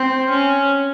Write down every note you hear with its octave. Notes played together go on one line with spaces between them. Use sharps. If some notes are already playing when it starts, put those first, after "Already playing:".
Already playing: C4
C#4